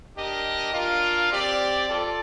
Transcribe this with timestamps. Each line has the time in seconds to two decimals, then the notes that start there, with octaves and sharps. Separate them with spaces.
0.17 D4 G4 A#4 D#5
0.74 D4 F4 A#4 F5
1.31 C4 G4 D5
1.88 F4 A4 D5